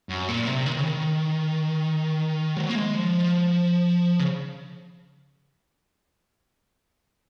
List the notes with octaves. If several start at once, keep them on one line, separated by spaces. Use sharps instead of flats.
F#2
A#2
C3
D#3
C#3
D#3
F#3
A#3
G#3
F3
C#3